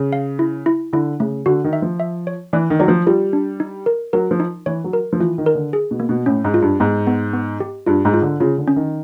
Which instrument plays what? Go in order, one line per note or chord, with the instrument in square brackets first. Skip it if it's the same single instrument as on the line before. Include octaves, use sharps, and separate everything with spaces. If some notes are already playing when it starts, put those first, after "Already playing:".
Already playing: [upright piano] C#3
[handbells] F5
E4
E4
[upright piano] D3 [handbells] E4
[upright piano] C#3 [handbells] A3
[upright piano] D3 [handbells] F#4
[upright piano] D#3
[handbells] E5
[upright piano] F3
[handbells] E5
C#5
[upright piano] E3 [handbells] D5
[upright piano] D#3
[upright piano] F#3 [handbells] D5
[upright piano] F3
[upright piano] G3 [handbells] F4
[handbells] D4
D#4
A#4
[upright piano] F#3 [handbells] A#4
[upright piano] F3
[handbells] D#4
[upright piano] E3 [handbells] C#5
[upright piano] F#3
[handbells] A#4
[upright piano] F3
[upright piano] E3 [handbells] F4
[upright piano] D#3
[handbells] A#4
[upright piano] D3
[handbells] G#4
[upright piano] B2
[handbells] A#3
[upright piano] B2
[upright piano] A2 [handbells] C#4
[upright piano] G#2
[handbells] F4
[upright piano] G2
[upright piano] G#2 [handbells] B3
[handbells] B3
B3
G4
[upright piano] G2 [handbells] F4
[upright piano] G#2
[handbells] F4
[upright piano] D3
[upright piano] C#3 [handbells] F4
[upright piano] D3
[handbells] C#4
[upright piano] D#3